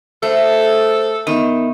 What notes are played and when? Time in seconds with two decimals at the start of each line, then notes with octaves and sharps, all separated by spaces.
0.23 A3 A4 C5
1.27 D#3 B3 E5